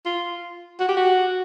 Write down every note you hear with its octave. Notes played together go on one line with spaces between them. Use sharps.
F4
F#4
G4
F#4